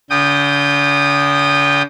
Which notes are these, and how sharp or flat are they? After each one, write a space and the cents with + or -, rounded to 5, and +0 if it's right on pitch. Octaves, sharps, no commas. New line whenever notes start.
D3 -45 G5 +0 D#6 -25